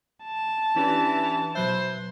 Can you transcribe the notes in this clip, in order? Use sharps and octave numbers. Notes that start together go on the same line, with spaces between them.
A5
E3 C#4 D4 G4
B2 F#3 B4 C5 E5